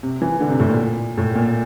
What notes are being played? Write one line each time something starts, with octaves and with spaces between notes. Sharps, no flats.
C3
E3
D3
C3
A2
A#2
A2
A#2